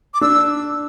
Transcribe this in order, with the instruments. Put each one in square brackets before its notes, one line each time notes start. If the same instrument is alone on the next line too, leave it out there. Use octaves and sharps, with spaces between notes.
[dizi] D6
[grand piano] D4 [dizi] E6